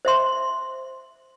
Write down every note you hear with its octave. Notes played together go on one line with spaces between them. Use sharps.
C5 E5 C6